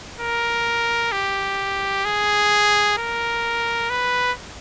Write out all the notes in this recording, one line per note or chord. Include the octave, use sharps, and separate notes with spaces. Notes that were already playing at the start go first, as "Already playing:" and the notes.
A#4
G4
G#4
A#4
B4